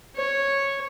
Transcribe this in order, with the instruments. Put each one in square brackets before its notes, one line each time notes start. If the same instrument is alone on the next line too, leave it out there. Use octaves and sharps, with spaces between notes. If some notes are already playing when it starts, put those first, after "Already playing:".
[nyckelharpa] C#5